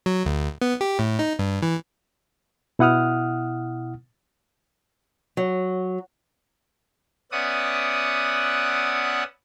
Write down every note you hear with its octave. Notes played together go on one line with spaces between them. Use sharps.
F#3
D2
B3
G4
A2
D#4
G2
E3
B2 E4 F#5 D#6 F6
F#3
B3 C#4 D5 E5 F#5 D#6